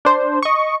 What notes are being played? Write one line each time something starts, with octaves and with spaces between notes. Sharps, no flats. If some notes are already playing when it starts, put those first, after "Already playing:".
D4 C5
D#5 C#6